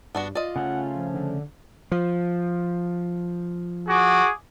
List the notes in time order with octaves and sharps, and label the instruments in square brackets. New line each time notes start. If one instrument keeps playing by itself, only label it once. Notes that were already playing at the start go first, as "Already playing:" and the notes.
[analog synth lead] G2 [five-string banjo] B3 D4 F#4
[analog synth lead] F4 [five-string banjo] D5 D#5
[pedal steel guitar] C#3 A3 C#4 [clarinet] F#5
[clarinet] F3
[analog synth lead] D3
[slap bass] F3
[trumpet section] F#4 G#4 D6